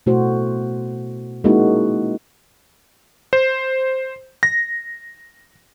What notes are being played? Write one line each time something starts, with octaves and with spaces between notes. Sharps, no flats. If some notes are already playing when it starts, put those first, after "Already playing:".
B2 A3 E4 F#4 C5
G#3 A#3 C#4 D#4 E4 F#4
C5
A#6